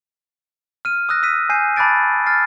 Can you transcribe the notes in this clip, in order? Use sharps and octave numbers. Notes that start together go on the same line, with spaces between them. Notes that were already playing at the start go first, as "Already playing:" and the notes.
F6 D#7
D#6 E6 F#6 A#6
E6 F#6 B6 D#7
G#5 G6 C7 D#7
A5 B5 D6 F#6 A6 D7
F6 A6 C7